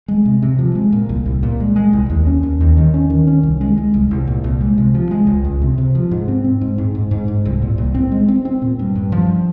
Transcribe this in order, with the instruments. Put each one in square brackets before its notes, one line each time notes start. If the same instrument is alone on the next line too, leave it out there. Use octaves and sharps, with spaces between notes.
[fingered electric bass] G#3
C3
C3
F3
G#3
A#2
C2
C2
A#2
G#3
G#3
C2
D#2
C#4
D#2
D#2
D#3
C#4
D#3
C#4
C2
G#3
G#3
C2
C2
A#2
C2
G#3
C3
F3
G#3
C#2
C#2
C3
C3
F3
G#2
C4
C4
G#2
G#2
G#2
G#2
G#2
C2
A#2
C2
C4
G#3
C4
C4
A#2
G2
G2
F3